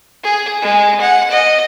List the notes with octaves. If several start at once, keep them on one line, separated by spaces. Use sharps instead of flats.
G#4
G#3
F#5
D#5